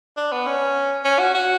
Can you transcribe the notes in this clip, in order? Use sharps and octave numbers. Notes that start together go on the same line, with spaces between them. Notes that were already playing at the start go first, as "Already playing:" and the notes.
D4
B3
C#4
C#4
F#4
F#4